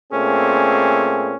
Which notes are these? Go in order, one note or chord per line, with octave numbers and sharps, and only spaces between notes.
A#2 A3 C4 C#4 G#4